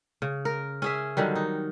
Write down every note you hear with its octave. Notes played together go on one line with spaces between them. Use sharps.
C#3
A#4
C#4 G#4 E5
D3 D#3 F#3 G3
D#4